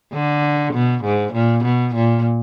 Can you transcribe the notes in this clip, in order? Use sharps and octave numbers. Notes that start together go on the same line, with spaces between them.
D3
B2
G#2
A#2
B2
A#2